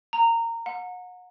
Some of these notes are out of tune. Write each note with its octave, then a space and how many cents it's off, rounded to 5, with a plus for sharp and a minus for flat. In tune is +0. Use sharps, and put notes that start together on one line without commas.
A#5 -20
F#5 -35